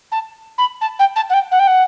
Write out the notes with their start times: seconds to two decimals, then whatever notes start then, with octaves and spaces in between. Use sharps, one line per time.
0.12 A5
0.58 B5
0.81 A5
0.99 G5
1.16 A5
1.30 F#5
1.33 G5
1.51 F#5
1.59 G5
1.67 F#5